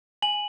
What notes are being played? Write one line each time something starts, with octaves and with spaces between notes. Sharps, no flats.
G#5 F#7